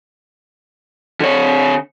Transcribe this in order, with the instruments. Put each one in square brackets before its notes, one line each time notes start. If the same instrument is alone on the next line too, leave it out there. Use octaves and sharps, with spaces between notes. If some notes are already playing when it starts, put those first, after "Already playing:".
[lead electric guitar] D3 C#5